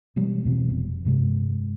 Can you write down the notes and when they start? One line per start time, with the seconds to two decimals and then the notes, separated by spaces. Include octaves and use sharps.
0.16 B2 E3 G3 G#3
0.45 E2 B2 E3 C4
0.69 F1
1.05 G2 C3 G#3